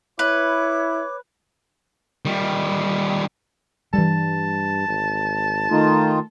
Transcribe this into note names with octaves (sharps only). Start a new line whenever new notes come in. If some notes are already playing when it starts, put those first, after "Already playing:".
E4 B4 C#5 D6
D#3 G3
G2 E3 G3 A5
G#1
D#3 A3 D#4 F4